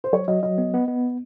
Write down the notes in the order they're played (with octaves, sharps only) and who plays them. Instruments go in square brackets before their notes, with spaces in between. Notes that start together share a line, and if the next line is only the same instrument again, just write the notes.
[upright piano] C5
[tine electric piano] F#3 [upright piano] C#5
[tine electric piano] F#3 [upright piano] D#5
[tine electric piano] F#3 [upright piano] D#5
[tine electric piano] B3
B3
B3